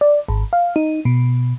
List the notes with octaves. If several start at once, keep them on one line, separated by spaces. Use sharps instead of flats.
D5
G#1
F5
D#4
B2